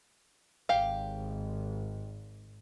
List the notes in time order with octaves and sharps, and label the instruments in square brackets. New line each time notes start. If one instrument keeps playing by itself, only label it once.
[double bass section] G#1 [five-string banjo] G4 F5